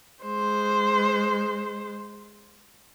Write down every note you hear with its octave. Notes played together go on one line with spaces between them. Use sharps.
G#3 C5